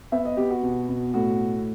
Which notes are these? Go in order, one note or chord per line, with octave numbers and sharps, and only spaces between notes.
B3 E5
D#5
B3 G4
F#4
B2
B2
A2 F#4